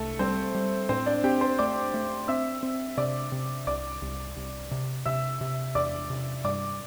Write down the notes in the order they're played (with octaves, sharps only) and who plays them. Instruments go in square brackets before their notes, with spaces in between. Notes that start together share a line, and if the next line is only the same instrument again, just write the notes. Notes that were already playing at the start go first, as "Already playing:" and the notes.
Already playing: [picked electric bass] C2 [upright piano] A3 A4
[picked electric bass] G3 [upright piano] C4 C5
[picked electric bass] G3
[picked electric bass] A2 [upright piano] C4 C5
[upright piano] D4 D5
[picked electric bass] C4 [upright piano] G4 G5
[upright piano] C5 C6
[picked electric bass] A3 [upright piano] D5 D6
[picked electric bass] A3
[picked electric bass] C4 [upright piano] E5 E6
[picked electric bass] C4
[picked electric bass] C3 [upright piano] D5 D6
[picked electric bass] C3
[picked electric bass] C2 [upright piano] D5 D6
[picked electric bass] C2
C2
C3
[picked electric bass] C3 [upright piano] E5 E6
[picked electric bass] C3
[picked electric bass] E2 [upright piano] D5 D6
[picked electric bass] C3
[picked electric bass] G2 [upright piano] D5 D6